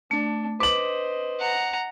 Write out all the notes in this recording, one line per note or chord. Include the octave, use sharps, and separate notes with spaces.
A3 D4
B4 C5 D#5 D6 F#7
F#5 A#5